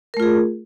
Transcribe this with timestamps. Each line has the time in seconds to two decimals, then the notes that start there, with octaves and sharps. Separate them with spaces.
0.14 A#4
0.17 A3
0.20 F4
0.22 G#4